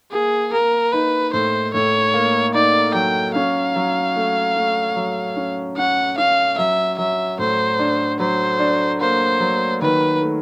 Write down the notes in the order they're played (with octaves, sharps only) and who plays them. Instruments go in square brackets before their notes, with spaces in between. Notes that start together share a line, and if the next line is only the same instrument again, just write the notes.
[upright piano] A#3 [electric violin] G#4
[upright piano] A#3 [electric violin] A#4
[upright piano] D#4 [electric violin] B4
[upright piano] A2 [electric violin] C5
[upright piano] A2 [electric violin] C#5
[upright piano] A#3
[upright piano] D#4 [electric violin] D5
[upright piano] F#3 [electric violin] G5
[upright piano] C#4 [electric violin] F5
[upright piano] F#3
A3
A3
F#3
C#4
[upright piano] C#4 [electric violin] F#5
[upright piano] C#4 [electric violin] F5
[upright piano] F#3 [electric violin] E5
[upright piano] F#3 [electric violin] E5
[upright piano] A2 [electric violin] C5
[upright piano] D4
[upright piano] F#3 [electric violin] C5
[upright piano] D4
[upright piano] A#3 [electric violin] C5
[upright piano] F#3
[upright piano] D#3 [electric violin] B4
[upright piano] A3